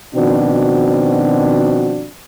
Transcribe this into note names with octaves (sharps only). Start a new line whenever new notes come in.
B2 D#3 F3 C4 D4 F#4